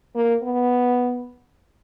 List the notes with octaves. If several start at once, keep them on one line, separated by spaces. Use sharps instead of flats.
A#3
B3